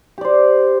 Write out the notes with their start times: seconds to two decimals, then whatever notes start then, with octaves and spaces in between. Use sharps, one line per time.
0.18 G4
0.21 D5
0.25 C5